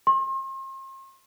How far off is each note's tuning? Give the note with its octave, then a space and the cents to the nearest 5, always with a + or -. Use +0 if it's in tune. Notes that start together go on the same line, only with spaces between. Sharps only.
C6 +40